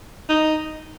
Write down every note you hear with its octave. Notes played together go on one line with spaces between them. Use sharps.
D#4